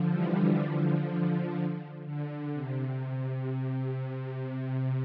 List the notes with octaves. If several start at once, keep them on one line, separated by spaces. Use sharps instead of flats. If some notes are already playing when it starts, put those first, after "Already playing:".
Already playing: D3 F3
E3 G3
D3 F3
D3
C3